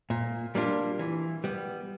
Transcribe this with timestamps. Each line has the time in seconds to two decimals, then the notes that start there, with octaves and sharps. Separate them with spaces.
0.10 A#2
0.55 G3 A#3 D4 F4
0.99 E3
1.44 G3 B3